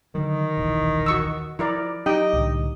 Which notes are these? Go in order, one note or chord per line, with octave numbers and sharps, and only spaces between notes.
D3 D#3 F#3
D#1 B1 E3
F#4 C#6 E6
F3 E4 A#4 D5
F#3 D#4 G4 D#5 G5
C2 A2 D3